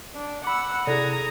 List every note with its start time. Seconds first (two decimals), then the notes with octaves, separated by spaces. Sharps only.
0.15 D4
0.44 F#5 B5 D6 E6
0.87 C3 E4 G#4 A4 D5 A#5 D#6 G#6